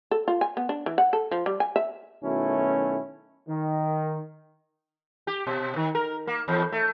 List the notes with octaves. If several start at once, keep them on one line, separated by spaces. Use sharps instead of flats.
A4
F4
G#5
B3
D4
E3
F#5
A4
F3
G3
G#5
E5
B1 D#3 F#3 A3 C#4 E4
D#3
G4
B2
D#3
A#4
A#3
E2
A3